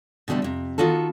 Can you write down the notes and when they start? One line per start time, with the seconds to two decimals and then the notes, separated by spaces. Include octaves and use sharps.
0.28 B2 D3 G3 A3 C4
0.42 F2 C3
0.78 D#3 B3 F4 F#4 A4